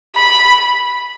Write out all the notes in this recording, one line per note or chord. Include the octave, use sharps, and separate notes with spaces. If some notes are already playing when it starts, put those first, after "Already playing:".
B5